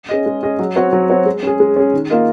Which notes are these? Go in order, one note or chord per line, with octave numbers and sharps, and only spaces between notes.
C#4 G#4 D#5
G#3
C#4 G#4 D#5
F#3
C4 F#4 C#5
F#3
C4 F#4 C#5
G#3
C#4 G#4
G#3
C#4 G#4
D#3
A#3 F4 A#4 D#5